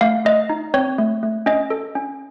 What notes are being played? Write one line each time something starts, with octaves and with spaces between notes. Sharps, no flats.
A3 F5
A3 D#5
D#4
C4 C#5
A3
A3
C#4 D#5
A4
C#4